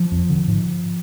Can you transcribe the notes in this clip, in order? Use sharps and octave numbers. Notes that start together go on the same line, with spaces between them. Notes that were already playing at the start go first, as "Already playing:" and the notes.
Already playing: F3
F2
D3
G#2